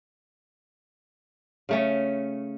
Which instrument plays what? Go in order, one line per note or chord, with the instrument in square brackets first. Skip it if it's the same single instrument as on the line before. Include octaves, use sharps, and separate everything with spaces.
[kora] C#3 A3 C#4